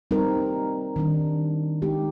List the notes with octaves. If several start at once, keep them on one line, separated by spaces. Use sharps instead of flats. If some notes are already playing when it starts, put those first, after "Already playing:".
G3 C4 D#4 A#4
D#3 G3 D4
G#3 D#4 G4